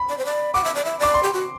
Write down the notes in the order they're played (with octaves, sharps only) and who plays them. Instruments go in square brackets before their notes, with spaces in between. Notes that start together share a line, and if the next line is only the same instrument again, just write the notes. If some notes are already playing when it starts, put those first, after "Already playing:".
Already playing: [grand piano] B5
[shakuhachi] D5
C5
D5
[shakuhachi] F#5 [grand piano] D6
[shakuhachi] E5
D5
E5
[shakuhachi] D5 [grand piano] D6
[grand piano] C6
[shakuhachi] G4
F#4